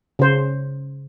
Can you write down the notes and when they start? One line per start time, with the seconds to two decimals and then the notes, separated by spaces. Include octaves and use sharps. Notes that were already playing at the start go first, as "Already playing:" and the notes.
0.19 C#3 C5